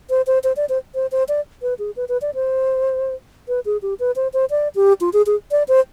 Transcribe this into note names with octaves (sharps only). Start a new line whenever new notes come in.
C5
C5
C5
D5
C5
C5
C5
D5
B4
G#4
B4
B4
D5
C5
B4
G#4
G4
B4
C5
C5
D5
G4
F4
G#4
G#4
D5
C5